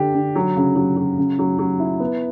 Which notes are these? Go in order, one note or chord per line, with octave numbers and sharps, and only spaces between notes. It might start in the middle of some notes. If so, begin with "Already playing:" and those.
Already playing: D3 D4 G4
D3
F#3
C#3
F#3
F#3
C#3
F#3
F#3
E4
B3